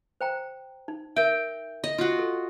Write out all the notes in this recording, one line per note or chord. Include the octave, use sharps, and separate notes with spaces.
C5 G5 A#5
D#4
A#4 E5 G5
D#5
F4 F#4
A4